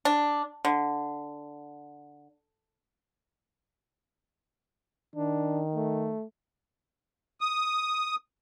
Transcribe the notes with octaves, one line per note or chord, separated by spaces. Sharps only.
D4
D3
D#3 D4
A3
D#6